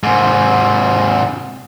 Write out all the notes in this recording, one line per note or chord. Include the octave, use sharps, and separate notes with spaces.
G#2 C3